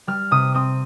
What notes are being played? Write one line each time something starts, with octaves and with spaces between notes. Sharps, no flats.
G3 F6
C3 D#6
C4 D#6